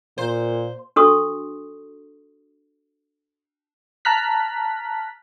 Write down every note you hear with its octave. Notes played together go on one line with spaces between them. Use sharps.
A#2 C5
D4 F#4 A4 C6 C#6 D#6
A5 A#5 F6 F#6 B6